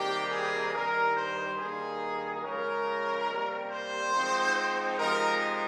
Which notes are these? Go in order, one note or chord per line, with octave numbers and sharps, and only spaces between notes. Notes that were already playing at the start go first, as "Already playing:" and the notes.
Already playing: C3 D#3 G3 A#3 G4
G#4
G2 D#3 G3 A#4
C5
G2 D#3 A#3 D#4 G#4
C#3 F3 G#3 C#4 A#4
C3 G3 A#3
C5
G#2 F3 C4 D#4
C3 F3 G#3 D#4 A#4